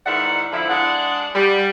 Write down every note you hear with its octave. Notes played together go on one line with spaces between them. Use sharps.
G#2 D#3 E3 D5 E5 F#5
D3 F3 E4
G#3 D4 G#4 F#5
G3